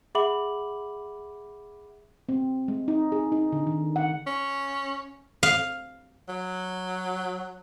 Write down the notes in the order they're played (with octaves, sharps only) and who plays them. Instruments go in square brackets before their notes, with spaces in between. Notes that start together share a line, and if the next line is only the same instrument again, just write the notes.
[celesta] G#4 E5 F#5 B5 D6 F#7
[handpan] C4
G#3
D#4
G#4
D#4
D3
D#3
F#5
[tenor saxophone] C#4
[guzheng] F5
[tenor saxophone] F#3